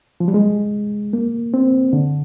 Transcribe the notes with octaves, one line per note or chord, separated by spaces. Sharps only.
F3
G3
G#3
A#3
C4
D3